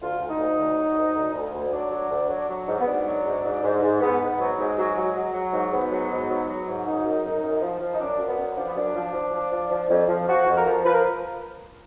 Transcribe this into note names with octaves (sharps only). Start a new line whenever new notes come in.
D2 F4
D2
D#4
D2
D2
F#3
D2
D2
D2
D2
F#3 D4
F#3
D2
F#3
F#3
G#2
B3
G#2 D4
F#3
G#2
G#2
G#2
G#2
G#2 B3
G#2
B3
F#3
G#2 G#3
F#3
F#3
F#3
F#3
G#2
G#2 B3
F#3
G#2
F#3
F#3
G#2
F#2 D#4
F#2
F#2
F#2
F3
F3
D#4
F#2 D4
F#2
B3
F#2
F3 D4
B3
F#2 D4
F3
F3
F3
F3
F3
F2
F3
F3 F#4
F2
A#4
F3
F3 B4
A#4